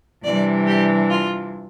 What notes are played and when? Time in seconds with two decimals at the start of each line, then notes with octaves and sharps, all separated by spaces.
0.23 C3 E3 G3 D4 D5
0.66 G4
1.09 F4